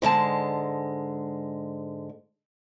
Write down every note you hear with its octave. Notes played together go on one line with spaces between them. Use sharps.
G#2 D3 G#3 A5